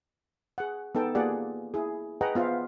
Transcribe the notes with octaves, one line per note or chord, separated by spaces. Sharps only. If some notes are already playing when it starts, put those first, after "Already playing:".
G#4 F#5
B3 D#4 A4 G5 A5
A#3 F4 G4 G#4 D5 F#5
E4 G#4
G#4 B4 D#5 F#5 G5 A#5
B3 F4 C5 E5 F5